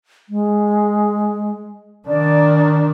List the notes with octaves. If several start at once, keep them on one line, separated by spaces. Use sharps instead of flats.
G#3
D#3 D4 D5